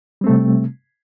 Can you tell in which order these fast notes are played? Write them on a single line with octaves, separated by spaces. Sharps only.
G3 C4 A3 C3